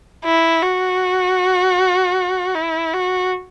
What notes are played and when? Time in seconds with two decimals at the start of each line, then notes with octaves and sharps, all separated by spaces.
0.25 E4
0.63 F#4
2.55 E4
2.94 F#4